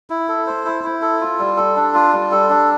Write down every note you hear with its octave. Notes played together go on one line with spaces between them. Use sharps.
E4
A4
C5
E4
E4
A4
F4
G3
A4
D4
F4
G3
A4
D4